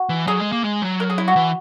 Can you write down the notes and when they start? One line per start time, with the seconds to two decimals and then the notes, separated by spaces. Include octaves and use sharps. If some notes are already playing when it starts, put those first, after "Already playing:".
Already playing: F#4
0.09 E3
0.27 F#3 G#4
0.40 G#3
0.52 A#3
0.64 G#3
0.82 F#3
1.00 A#4
1.10 G#4
1.18 E4
1.28 F#4
1.36 E3